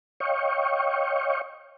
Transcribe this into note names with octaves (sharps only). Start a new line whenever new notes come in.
C#5 D#5 F5 G5 C#6